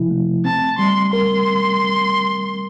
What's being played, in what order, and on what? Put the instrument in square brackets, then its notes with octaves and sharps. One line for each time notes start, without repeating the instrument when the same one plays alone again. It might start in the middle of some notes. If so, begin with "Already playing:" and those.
Already playing: [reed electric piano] C3 F3 E4
A3
[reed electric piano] C4 [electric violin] A5
[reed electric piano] G3 [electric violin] C6
[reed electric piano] A#4 [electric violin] C6